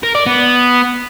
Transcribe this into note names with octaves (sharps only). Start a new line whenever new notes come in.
A#4
D5
B3